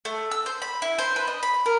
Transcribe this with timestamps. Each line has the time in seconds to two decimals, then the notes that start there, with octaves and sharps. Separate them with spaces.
0.05 A3
0.31 E6
0.46 C5
0.62 B5
0.82 E4
0.98 C5
1.16 B4
1.27 D#5
1.43 B5
1.66 A#4